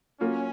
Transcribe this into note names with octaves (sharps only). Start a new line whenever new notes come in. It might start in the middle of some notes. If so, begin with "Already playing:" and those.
F#3 A#3 C#4 F4